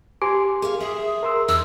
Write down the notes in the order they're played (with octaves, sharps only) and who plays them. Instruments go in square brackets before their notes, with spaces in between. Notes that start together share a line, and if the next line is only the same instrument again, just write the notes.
[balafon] G4 [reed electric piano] G#5 C6
[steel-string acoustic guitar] G#4 C#5 F5
[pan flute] G#4 [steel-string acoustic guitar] E5
[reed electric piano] A#4 C6 E6
[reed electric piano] E2 [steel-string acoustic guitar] D#4 [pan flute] E6